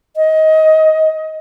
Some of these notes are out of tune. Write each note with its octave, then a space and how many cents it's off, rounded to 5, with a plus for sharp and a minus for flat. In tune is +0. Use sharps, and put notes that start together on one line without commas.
D#5 +20